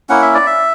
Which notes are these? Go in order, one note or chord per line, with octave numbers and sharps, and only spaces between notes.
A#3 C#4 E4 F#5
E5
D5
E5